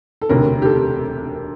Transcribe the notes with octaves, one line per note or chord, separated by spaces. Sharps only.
A4
E1 D2 C3 A#4
G4
A4